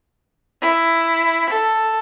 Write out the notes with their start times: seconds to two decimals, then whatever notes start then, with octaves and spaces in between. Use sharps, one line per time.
0.62 E4
1.50 A4